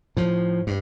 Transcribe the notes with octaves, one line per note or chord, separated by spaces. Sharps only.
A2 F3
G2